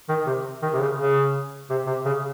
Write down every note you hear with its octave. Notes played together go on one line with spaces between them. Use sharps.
D#3
C3
D#3
C3
C#3
C#3
C3
C3
C#3